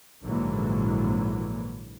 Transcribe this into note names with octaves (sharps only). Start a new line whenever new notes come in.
A#1 G#2 D3 E3 F#3 A#3